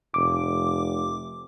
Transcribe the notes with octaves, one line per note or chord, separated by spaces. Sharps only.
F1 D6